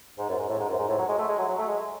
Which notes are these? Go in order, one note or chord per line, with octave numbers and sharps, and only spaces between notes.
G#2
F#2
G#2
A2
G#2
F#2
G#2
A2
F#3
G#3
A3
G#3
F#3
F#3
A3
G#3